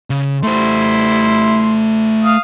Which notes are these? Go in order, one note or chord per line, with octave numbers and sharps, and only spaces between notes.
C#3
G3 A3 E4 C5 C6
F5 D#6